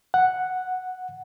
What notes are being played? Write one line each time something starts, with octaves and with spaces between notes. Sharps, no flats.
F#5